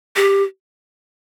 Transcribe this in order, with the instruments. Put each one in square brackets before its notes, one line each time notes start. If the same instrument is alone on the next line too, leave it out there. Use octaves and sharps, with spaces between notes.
[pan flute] G4